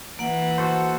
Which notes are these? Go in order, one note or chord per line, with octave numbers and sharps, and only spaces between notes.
E3 A#3 F#5
F#4 A4 C5